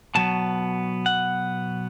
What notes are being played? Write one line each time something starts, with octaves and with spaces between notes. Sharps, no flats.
B2 F#3 B3 A5
F#5